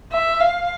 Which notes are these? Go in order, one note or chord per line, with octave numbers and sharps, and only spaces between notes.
E5
F5